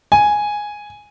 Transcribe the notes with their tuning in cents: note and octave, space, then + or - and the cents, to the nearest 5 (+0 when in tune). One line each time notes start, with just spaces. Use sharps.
G#5 +0